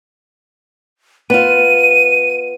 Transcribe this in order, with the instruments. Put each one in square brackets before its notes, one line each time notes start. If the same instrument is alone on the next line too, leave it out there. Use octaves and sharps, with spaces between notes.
[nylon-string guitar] B3 F4 [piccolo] D#7